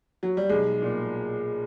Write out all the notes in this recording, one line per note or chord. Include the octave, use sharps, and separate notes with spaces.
F#3
G3
B1 G#3
A#2